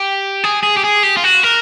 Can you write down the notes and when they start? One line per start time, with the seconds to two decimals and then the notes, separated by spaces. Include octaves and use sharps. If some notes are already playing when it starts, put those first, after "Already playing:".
Already playing: G4
0.44 G#4
0.63 G#4
0.77 G4
0.84 G#4
1.03 G4
1.17 F4
1.24 F#4
1.43 A#4